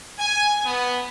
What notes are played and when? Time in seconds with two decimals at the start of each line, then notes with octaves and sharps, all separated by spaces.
0.18 G#5
0.64 B3